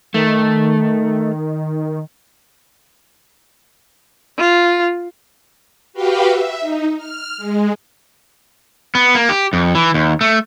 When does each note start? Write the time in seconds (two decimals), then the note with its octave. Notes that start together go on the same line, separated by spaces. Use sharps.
0.14 D#3 A3
4.38 F4
5.93 F#4 G4 B4 F5 G5
6.28 E5
6.61 D#4
6.97 F6
7.38 G#3
8.95 B3
9.15 A#3
9.29 G4
9.53 F2
9.75 E3
9.94 D#2
10.21 A3